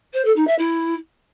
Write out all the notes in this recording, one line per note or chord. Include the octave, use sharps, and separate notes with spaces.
C5
A4
D#4
E5
E4